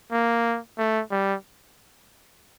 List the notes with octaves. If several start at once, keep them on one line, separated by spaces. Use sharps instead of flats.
A#3
A3
G3